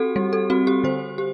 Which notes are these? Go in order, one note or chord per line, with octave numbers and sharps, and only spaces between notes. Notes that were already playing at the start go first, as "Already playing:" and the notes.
Already playing: C4 F#4 G4 A4
G3
A4
C4 F#4
G4
D3 C5
G4